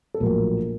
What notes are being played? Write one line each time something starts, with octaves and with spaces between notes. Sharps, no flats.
A4
A#1 A2 F#3 A#3 A#4